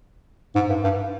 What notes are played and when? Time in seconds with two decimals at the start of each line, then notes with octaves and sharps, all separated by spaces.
0.56 G#2
0.69 G2
0.84 G2